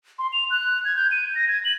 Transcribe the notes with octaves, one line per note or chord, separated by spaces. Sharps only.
C6
F7
F#6
G#6
G6
D#7
A#6
G#6
F#7